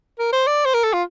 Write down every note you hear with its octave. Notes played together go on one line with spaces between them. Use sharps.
A#4
C5
D5
C5
A#4
A4
F4